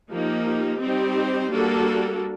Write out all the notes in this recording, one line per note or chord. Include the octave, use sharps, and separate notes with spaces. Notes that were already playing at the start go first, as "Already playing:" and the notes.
F3 A#3 D#4 G4
G3 C4 D#4 G4 C5
G3 A#3 D4 F#4 A4